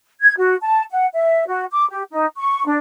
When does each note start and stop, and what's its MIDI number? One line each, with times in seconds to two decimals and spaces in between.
0.22 0.33 92
0.37 0.55 66
0.62 0.83 81
0.91 1.06 78
1.14 1.46 76
1.47 1.65 66
1.71 1.86 86
1.90 2.03 67
2.11 2.27 63
2.37 2.62 85
2.66 2.79 62